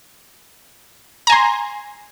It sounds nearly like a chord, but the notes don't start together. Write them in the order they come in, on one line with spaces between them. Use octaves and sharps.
A#5 G#5 C6